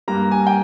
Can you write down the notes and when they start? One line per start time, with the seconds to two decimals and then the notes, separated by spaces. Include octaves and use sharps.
0.08 G2 G3 A#3 A#5
0.32 G#5
0.47 G5